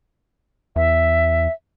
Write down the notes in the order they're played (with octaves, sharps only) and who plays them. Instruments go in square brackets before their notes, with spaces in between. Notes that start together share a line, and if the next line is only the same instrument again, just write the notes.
[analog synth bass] E2 [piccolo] E5